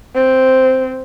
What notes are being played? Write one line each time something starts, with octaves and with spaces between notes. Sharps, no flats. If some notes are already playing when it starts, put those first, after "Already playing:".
C4